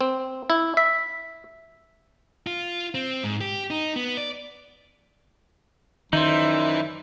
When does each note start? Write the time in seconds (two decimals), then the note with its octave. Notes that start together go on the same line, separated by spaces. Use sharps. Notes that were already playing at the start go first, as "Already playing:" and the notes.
0.01 C4
0.50 E4
0.77 E5
2.47 F4
2.94 C4
3.24 G#2
3.41 G4
3.70 D#4
3.96 B3
4.17 D5
6.13 F#2 D#3 E3 D#4 C5 D5 E5